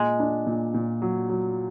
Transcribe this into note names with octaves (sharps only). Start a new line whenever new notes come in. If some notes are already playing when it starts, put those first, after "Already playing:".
Already playing: A#2 G#3
D4
A#2
A#2
F#3
F#3